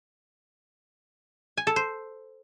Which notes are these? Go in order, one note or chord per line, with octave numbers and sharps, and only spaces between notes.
G#5
A4
C5